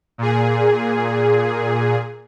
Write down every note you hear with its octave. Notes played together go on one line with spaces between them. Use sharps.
A#2 G#4